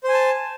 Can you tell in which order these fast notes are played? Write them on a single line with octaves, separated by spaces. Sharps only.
C5 G#5 A5